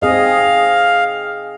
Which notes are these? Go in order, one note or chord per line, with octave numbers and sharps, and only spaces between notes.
C4 G#4 D#5 F5